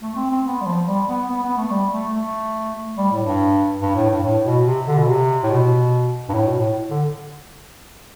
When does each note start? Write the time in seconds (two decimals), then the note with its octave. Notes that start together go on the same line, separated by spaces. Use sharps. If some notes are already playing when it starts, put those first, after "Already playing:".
0.02 A3
0.16 C4
0.30 C4
0.45 B3
0.61 G3
0.66 F3
0.86 G3
1.08 B3
1.29 B3
1.43 B3
1.57 A3
1.70 G3
1.92 A3
2.14 A3
2.97 G3
3.12 A2
3.25 G2
3.82 G2
3.95 A2
4.10 G2
4.23 A2
4.44 B2
4.65 C3
4.87 D3
4.98 B2
5.08 C3
5.43 A2
5.50 B2
6.29 G2
6.34 A2
6.47 B2
6.55 A2
6.90 D3